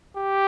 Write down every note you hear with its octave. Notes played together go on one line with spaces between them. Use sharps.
G4